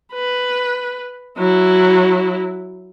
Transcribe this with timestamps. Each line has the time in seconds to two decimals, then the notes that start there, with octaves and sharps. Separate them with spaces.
0.13 B4
1.38 F#3 E4